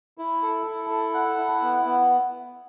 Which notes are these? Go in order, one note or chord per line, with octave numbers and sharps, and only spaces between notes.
E4
A4
E4
A4
F#5
E4
B3
B3